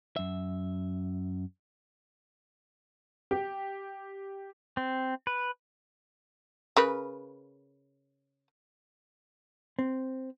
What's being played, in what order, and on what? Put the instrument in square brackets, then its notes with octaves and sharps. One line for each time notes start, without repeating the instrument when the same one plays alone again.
[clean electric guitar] F#2 E5
[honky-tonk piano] G4
[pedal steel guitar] C4
B4
[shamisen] C#3 A#4 B4
[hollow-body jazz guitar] C4